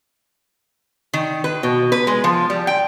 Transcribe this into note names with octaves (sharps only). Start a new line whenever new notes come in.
D#3
B4
B2
B4
G#3
F3
G3
G5